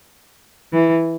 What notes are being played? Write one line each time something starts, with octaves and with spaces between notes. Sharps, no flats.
E3